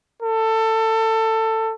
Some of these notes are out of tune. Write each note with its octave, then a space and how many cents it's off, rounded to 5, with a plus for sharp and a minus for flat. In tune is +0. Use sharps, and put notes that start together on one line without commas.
A4 +20